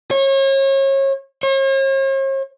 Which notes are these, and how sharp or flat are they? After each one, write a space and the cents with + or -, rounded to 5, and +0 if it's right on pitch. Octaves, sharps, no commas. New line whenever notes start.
C#5 -35
C#5 -45